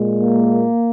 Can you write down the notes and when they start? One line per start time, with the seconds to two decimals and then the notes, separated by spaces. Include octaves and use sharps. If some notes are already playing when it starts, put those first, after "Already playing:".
Already playing: A#2 G#3
0.20 A#3